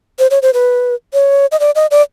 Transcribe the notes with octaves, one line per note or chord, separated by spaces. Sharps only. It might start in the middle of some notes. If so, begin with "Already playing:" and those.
C5
C#5
C5
B4
C#5
D#5
D5
D#5
D5